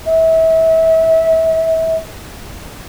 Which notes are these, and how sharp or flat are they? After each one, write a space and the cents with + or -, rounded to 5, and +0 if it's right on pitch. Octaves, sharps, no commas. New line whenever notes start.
E5 -30